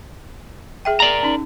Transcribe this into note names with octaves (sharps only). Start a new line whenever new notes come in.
G#4 E5 G5
A#4 D5 A#5
C#4 D#4